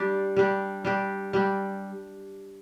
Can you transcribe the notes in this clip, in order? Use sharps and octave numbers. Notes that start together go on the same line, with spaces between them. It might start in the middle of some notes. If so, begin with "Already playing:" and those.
Already playing: G3 D4 G4
G3 D4 G4
G3 D4 G4
G3 D4 G4